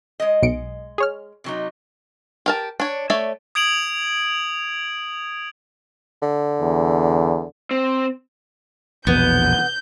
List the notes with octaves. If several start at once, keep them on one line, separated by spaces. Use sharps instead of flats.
G#3 D#5
B1 C#7 D7
G#4 C#5 F6
C3 F#3 D#4
G4 A#4 A5
D4 C#5
A3 C#5 D5 E5
D#6 G#6 D7 F7 F#7
D3
E2
C4
A#1 E2 B2 B3 G6